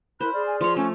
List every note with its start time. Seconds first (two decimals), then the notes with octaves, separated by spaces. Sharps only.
0.21 E4 A#4 C5 B5 F#6
0.33 G#4 D5 F6
0.47 G#5
0.61 F3 C#5 C6
0.76 A3 C#4